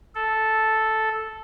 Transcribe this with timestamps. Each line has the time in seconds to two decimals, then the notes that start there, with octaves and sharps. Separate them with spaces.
0.15 A4